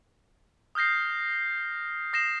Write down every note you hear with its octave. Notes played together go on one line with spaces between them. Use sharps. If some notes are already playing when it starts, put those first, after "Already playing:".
D#6 F6 G6 A#6 C7
D#6 A#6 C7 E7